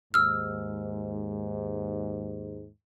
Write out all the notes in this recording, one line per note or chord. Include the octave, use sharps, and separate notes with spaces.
D#2 G#2 E6 F6